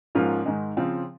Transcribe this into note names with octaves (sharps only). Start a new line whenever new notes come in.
G#2 F3 A#3 C#4 F4
G#2 D#3 G#3
C#3 F3 C4 F4